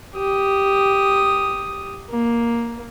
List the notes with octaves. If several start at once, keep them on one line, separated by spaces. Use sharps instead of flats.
G4 D#6
A#3